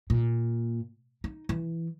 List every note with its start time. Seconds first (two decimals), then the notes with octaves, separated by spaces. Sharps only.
0.10 A#2
1.24 D#4
1.49 E3